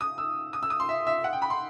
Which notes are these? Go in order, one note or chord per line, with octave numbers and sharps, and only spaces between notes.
D#6
E6
D#6
E6
D#6
C6
E5
E5
F#5
G5
B5
C6